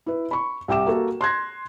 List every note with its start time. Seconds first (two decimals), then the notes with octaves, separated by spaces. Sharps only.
0.06 E4 B4
0.31 B5 C#6
0.68 C2 E5 G5 D6 E7
0.86 A#3 F#4 A4
1.21 C6 F#6 G#6 A#6